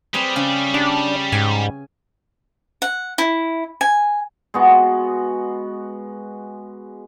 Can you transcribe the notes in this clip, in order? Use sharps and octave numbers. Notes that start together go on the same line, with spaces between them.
G3 C4 G#4 B4
C#3 C#4
D4 G4
G#2 G#5
F#5
E4
G#5
G#3 B3 F#4